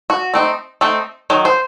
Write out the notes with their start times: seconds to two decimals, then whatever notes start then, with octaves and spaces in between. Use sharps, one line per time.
0.10 F#4
0.34 A3 C4 D#4
0.81 A3 C4 D#4
1.30 D#3 F#3
1.45 C5